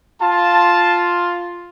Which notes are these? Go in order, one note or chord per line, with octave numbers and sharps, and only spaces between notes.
F4 A5